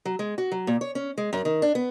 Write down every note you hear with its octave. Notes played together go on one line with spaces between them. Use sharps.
F#3
G#3
F#4
F#3
A#2
C#5
C#4
G#3
F#2
D#3
D4
B3